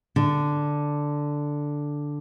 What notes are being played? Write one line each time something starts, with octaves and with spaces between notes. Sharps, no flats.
D3